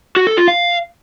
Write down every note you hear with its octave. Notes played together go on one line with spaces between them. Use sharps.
F#4
A4
F4
F5